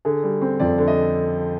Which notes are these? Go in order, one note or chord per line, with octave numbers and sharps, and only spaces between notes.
D3 G#4
G3
C4
F2 D5
D3
D#5